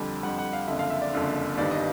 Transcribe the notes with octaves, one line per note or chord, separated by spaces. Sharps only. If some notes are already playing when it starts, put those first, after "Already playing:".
Already playing: F2 D3 G3
F2 D3 G3 F#5
F#5
F5
F#1 F2 D3 E5
F5
E5
D5
F#1 F2 D3
G1 G2 D#3 D5
D#5